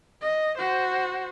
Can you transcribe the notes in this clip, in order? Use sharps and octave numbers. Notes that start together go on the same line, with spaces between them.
D#5
F#4 C5